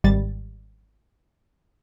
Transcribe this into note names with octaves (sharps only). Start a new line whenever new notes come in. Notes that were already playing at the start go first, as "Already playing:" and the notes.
G#1 G3 A6